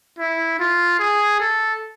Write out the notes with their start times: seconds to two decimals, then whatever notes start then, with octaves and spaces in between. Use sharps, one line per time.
0.19 E4
0.59 F4
0.99 G#4
1.40 A4